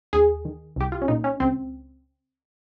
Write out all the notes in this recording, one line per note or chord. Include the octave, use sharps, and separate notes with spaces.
D#2 G#4
D#3
C2 G4
F4
C#4
A#2 D#4
C#4
C#2 C4